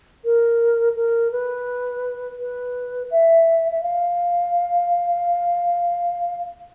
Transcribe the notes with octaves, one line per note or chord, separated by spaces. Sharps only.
A#4
A#4
B4
B4
E5
E5
F5